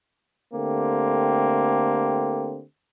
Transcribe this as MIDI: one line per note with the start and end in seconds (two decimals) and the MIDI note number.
0.54 2.62 50
0.54 2.62 57
0.54 2.62 58
0.54 2.62 60
0.54 2.62 67